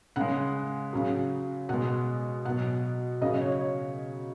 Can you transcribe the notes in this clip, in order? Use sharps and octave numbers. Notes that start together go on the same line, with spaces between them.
C#3 G#3 F#5
C#3 F#3
B2 G#3 F#5
B2 F#3 F#5
C#3 F#3 D#5
C#5
C#5